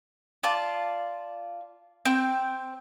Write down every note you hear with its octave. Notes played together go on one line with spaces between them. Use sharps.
F4 D5 A5
C4 G5